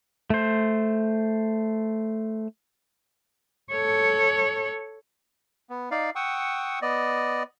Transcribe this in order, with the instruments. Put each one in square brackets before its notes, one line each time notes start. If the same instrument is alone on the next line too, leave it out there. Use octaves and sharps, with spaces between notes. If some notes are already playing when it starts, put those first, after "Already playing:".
[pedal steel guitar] A3 C5
[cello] A4 C#5
[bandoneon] B3
D#4 D5 F5
F#5 G5 C#6 D#6 E6
B3 D5 D#5